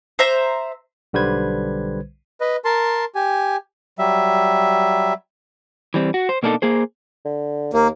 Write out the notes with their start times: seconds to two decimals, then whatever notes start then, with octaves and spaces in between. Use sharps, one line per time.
0.19 C5 E5 A#5
1.13 B1 D3 G3 B4 C5 G#6
2.41 B4 D#5
2.65 A#4 A5 C6
3.15 G4 G#5
3.99 F#3 G3 E5
5.94 E3 G3 C4
6.14 F#4
6.29 C5
6.43 B2 A#3 D4 D#4 A4
6.62 A#3 G#4 C5
7.25 D3
7.73 D#2 A#3